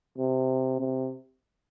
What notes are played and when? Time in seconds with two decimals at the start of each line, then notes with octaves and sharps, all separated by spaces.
0.18 C3
0.80 C3